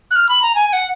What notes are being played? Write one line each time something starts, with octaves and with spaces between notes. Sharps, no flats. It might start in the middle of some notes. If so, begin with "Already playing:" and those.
F#6
F6
B5
A#5
G#5
G#5
F#5